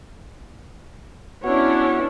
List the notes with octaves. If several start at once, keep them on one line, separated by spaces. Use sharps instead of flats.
B3 C#4 D4 E4 F#4 C#5